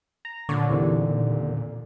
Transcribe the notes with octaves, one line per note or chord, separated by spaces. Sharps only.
A#5
A#2 D3 C#5 D5
E2 C3 D#3